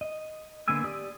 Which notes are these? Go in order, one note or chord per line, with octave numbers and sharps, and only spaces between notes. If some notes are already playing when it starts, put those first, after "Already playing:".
D#5
D3 A#3 B3 G#5 E6
G4 D5 D#6